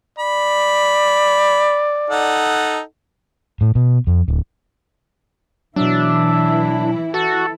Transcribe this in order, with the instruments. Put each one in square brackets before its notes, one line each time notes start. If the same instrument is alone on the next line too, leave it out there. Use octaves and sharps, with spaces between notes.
[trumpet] D5 [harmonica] B5
[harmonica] D#4 A4 F#5
[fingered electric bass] A2
B2
F2
D1
[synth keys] B2 F#3 [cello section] E3 E4 [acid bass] D4 [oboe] E5
[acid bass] F#4 [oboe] A4